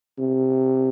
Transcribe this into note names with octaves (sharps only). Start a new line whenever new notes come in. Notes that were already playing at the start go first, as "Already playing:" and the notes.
C3